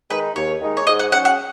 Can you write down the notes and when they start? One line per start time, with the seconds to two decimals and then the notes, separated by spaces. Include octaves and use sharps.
0.10 D#3 G#3 D#4 B4
0.36 D#2 C#5
0.62 D#3 G#3 D#4
0.77 C#5
0.87 G#2 D#5
0.99 F#5
1.12 F#3 C#4 F#5
1.25 F#5